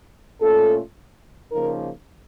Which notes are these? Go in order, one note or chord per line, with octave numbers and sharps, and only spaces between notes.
A#2 A3 C#4 F4 A4
C#3 F3 A#3 D#4 A#4